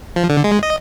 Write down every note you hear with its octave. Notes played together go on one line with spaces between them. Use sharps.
F3
D3
G#3
D#5